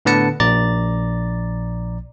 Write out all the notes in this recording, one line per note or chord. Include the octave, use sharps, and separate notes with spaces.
A2 D3 B3 B4 A5 C#7
A#1 D5 A#5 A6